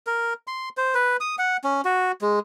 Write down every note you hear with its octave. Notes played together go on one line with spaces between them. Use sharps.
A#4
C6
C5
B4
D#6
F#5
C#4
F#4
G#3